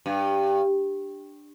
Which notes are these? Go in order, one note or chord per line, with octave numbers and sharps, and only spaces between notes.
G2